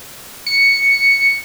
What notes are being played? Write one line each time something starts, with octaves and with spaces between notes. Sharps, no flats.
C#7